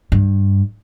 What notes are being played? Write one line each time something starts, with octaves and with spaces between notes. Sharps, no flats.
G2